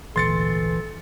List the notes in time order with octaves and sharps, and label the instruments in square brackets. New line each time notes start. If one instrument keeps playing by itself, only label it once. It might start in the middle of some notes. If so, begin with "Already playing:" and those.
[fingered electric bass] G#1 D2 A#2 [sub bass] E3 [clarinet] A4 [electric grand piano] C6 A6 C#7